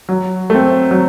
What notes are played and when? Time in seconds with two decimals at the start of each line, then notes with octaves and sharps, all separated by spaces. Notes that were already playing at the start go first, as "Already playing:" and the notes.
0.09 F#3
0.50 A3 C4
0.91 F#3